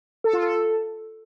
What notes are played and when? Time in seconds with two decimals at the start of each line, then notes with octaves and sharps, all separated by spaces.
0.24 A4
0.33 F4
0.43 A4